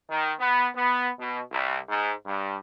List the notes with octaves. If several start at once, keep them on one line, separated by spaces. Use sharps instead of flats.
D#3
B3
B3
B2
C2
G#2
G2